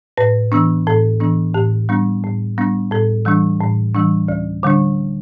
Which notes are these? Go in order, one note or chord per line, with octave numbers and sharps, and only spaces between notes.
A2 B4
E3 B3 D4
A2 A4
E3 B3 D4
A2 G4
G3 B3 D4
A2
G3 B3 D4
A2 A4
E3 G3 D4
A2
E3 G3 D4
D2
D3 G3 D4